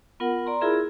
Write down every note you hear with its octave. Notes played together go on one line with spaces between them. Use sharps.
B3 F4 A#4 F#5
D5 A#5 C6
E4 F4 G#4 A#4 E5 B5